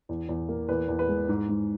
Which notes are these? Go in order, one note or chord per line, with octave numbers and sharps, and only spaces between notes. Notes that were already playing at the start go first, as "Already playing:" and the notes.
E2
E2
A#3
E2 B4
E2
B4
G#3
G#2
G#2